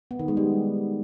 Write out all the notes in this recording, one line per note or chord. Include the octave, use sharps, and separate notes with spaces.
B3
D#3
G#3
G3